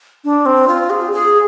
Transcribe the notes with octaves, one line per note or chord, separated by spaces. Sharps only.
D4
C4
F4
G#4
G#4